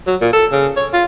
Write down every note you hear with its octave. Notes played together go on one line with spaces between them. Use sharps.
F#3
A#2
A4
C#3
C#5
F4